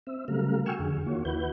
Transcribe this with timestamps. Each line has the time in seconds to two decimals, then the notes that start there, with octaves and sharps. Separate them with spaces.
0.07 C4 E5
0.28 C#3 F#3 G3 A3 A#4 F5
0.66 F#4 G5 G#5 C#6 E6 F6
0.79 F2 D3 G#4
1.06 D#3 A#3 F4 F#4 C#5
1.25 D#2 E4 F#4 B4 G6